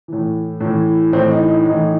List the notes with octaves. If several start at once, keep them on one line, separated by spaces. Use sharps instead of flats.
A2 E3
A2 E3
A2 E3 C4
D#4
D#4
A2 E3 D#4